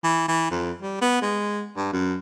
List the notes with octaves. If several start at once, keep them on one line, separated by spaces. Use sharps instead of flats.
E3
E3
F2
G3
B3
G#3
G2
F#2